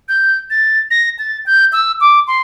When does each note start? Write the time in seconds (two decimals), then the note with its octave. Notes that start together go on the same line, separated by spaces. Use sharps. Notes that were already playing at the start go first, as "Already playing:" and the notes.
0.09 G6
0.50 A6
0.91 A#6
1.19 A6
1.46 G6
1.73 E6
2.01 D6
2.27 C6